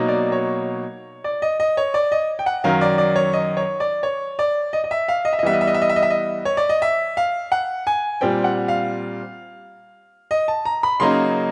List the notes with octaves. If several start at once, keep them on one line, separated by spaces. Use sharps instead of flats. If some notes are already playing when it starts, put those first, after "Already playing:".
Already playing: B2 F#3 A#3 D#4
D5
C#5
D5
D#5
D#5
C#5
D5
D#5
G5
F#5
F#2 D#3 F#3 F5
D5
D5
C#5
D#5
C#5
D5
C#5
D5
D#5
D#5
E5
F5
D#5
E5
D#5
E3 G3 B3 E5
D#5
E5
D#5
E5
D#5
E5
D#5
E5
D#5
C#5
D5
D#5
E5
F5
F#5
G#5
A#2 G3 C4 G5
F#5
F5
D#5
A5
A#5
B5
C#3 F#3 A#3 D#4 C6